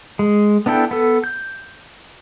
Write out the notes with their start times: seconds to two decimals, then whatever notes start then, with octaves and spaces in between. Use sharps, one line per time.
0.19 G#3
0.66 B3 D4 E4 A4 G5
0.91 B3 A4
1.24 G6